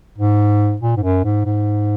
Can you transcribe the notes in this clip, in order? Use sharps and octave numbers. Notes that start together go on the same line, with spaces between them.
G#2
A#2
G#2
F#2
G#2
G#2